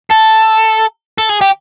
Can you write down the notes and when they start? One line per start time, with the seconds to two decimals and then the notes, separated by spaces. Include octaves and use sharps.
0.11 A4
1.18 A4
1.29 G#4
1.42 G4